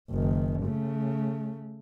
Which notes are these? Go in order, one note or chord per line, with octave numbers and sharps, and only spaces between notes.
F#1 D#3
C#3 A3